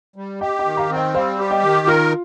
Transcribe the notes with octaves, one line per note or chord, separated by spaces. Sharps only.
G3
G4 D#5 G5
D#5 G5
D#3
F5 A#5
C4
D#5 G5
G3 C5 F5
G4
D#5 G5
D#3
F4 A#4